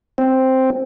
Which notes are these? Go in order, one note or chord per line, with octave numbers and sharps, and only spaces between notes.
C4